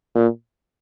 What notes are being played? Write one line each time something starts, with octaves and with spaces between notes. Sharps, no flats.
A#2